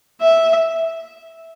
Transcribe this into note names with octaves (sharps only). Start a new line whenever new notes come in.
E5